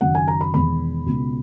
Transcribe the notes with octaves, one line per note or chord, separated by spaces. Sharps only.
F#1 F#2 D#3 F#5
G#5
A#5
B5
E1 E2 D#3 B5
C#2 B2